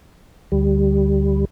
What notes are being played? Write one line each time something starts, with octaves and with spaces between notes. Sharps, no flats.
D2 G3